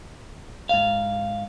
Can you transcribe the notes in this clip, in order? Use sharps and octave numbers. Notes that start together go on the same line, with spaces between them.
G#2 F5